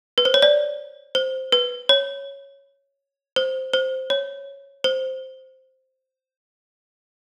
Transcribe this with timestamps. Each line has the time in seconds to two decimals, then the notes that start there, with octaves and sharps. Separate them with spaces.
0.18 B4
0.25 C5
0.34 C#5
0.42 D5
1.15 C5
1.52 B4
1.89 C#5
3.36 C5
3.73 C5
4.10 C#5
4.84 C5